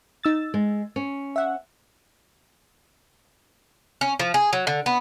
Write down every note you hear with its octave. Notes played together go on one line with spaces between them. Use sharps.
D#4 E6 A6
G#3
C#4
E5 F#5
C#4
F3
G#4
F#3
D3
B3